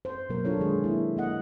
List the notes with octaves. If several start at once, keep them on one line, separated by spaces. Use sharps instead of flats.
C5
B2 F#3 A#3 A#4 C5
D4 F4 A4 C#5
D#3 G#3 G#4
A#3 E4
A#3 D#5 F#5